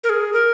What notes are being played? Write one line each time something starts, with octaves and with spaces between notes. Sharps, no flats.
A#4
G#4
A#4